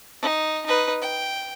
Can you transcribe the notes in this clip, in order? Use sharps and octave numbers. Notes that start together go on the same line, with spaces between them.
D#4
D#4 B4
G5